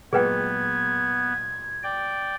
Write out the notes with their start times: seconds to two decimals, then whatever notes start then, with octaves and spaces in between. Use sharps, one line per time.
0.13 A#2 F#3 G#3 B3 G#4 B4 G5 G#6
1.83 D5 G5